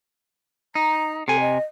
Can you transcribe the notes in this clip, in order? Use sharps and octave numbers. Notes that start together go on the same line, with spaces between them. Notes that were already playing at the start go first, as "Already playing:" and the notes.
D#4 A#5
C3 A4 G#5
D#5